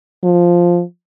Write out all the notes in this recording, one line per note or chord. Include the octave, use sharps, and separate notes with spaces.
F3